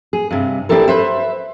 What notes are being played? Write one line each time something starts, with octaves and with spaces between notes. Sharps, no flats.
G#4
G2 C3
C4 D4 E4 G4 A4 A#4
B4 C5 E5